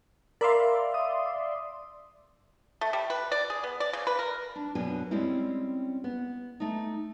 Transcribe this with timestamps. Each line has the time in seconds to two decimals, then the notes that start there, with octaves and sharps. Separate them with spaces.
0.41 A#4 D5 E5 F5 B5 C6
0.94 D#6
2.81 A3
2.93 G3
3.10 B4
3.32 D5
3.50 G#4
3.64 B3
3.80 D5
3.93 C#3
4.07 B4
4.19 A#4
4.56 D4
4.75 F#2 B2 D4 B4 G#5
5.11 G3 G#3 C4 C#4 E4
6.04 B3
6.60 A3 D#4